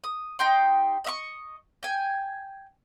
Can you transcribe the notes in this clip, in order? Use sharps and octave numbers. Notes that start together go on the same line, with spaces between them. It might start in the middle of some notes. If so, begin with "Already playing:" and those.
D#6
D#4 G4 G5 C6
D#5 E5 C#6
G5 G#5